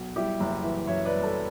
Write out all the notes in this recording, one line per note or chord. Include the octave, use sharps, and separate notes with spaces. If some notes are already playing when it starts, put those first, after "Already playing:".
Already playing: B1
G3 E4 G4
F#1
E3
F#2 C#5 E5
B4 D5
G3
A4 C#5